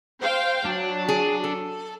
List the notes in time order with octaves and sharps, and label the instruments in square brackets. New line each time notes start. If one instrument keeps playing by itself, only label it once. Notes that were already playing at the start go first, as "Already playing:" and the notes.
[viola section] C5 F5 G5
[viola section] F#3 [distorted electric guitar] D4
[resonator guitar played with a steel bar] G#4
A4